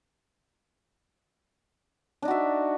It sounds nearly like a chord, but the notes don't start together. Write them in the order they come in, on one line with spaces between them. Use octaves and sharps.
D4 D#4 F#4 E5